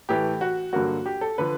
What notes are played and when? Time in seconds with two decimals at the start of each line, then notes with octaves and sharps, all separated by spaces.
0.09 A2 E3 A3 G4
0.41 F#4
0.73 G2 D3 F#3 A#3 F#4
1.06 G4
1.21 A4
1.38 D3 F3 B4